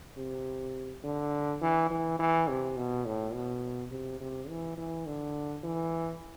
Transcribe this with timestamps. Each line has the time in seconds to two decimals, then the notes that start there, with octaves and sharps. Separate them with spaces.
0.17 C3
1.04 D3
1.61 E3
1.90 E3
2.19 E3
2.48 C3
2.77 B2
3.05 A2
3.33 B2
3.91 C3
4.20 C3
4.49 E3
4.77 E3
5.06 D3
5.64 E3